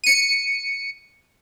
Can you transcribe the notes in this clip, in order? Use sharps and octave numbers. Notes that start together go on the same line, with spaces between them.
C#7 D#7